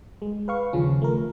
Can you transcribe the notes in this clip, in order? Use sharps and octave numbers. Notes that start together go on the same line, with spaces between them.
G#3
B4 F5 C#6
D#2 C#3 F3 C#4
A3 A#4